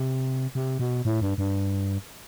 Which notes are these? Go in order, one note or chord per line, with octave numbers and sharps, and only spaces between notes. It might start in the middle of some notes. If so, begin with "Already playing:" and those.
Already playing: C3
C3
B2
A2
G2
G2